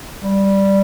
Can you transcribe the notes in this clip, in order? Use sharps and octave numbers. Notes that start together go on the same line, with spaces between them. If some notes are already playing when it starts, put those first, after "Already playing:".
G3